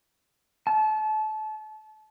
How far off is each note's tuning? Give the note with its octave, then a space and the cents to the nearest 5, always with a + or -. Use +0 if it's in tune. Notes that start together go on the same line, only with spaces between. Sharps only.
A5 -30